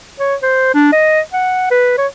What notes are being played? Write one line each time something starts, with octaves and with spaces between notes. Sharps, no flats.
C#5
C5
D4
D#5
F#5
B4
C#5